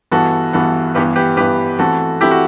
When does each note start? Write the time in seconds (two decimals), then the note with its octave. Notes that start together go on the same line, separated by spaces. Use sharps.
0.11 G2 E3 B3 F#4 A4
0.53 G2 E3 B3 F#4 A4
0.95 G2 E3 B3 G4 B4
1.16 G4 B4
1.37 G2 E3 B3 G4 B4
1.79 E3 A3 C4 F#4 A4
2.21 E3 A3 C4 E4 G4
2.31 F#4